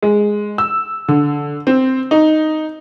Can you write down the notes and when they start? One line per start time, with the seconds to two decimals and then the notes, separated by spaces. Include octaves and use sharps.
0.03 G#3
0.58 E6
1.08 D3
1.67 C4
2.11 D#4